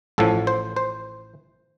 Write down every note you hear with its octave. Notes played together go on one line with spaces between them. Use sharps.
A1 A2 F3 A4
C5
C5